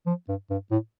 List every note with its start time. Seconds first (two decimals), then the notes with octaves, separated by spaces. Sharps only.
0.07 F3
0.28 G2
0.50 G2
0.71 A2